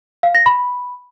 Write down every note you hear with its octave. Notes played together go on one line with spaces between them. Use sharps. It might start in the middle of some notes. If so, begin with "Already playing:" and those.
F5
A#6
B5